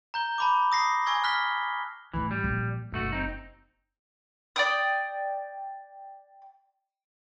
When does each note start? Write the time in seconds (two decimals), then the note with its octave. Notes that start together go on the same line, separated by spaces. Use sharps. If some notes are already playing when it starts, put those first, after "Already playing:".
0.14 A#5 G6 G7
0.38 A5 B5 D6
0.72 D#6 A#6 C7
1.06 G#5 C#6 E6 G#6 A#6 G7
1.24 F6 F#6 B6 G7
2.13 D2 A2 E3
2.31 G3
2.44 A#1
2.92 F#1 B1 A3 F#4
3.12 C4 D#4
4.56 D5 G5 D#6